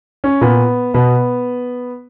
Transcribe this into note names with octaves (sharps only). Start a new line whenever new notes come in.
C#4
A#2 B3
B2 B3